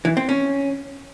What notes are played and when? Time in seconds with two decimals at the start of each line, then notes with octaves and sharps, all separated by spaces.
0.05 E3
0.17 C4
0.29 C#4